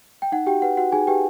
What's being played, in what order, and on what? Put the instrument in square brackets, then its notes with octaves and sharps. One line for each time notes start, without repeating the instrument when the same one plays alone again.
[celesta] G5
D#4 F#5
F#4 G4 G5
B4 F#5
F#4 F#5
D#4 G#4 G#5
G4 B4 G5